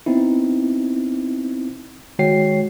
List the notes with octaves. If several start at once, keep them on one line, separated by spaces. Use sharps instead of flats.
B3 C4 D#4 E4
D#3 G#3 F#4 C#5 G5 C7